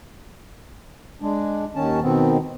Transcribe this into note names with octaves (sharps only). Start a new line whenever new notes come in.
G#3 D4
D#2 D#3 C#4 A5
B2 D#3 B3 C4